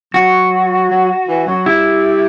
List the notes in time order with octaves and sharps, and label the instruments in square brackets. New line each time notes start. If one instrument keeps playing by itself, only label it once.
[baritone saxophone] F#3 [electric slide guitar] F#4
[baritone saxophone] F#3
E3
F#3
[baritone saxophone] G3 [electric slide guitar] E4